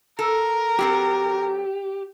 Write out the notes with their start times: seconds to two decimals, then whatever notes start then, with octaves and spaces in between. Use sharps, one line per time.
0.19 A4 A#4
0.79 F#3 C4 G4 A4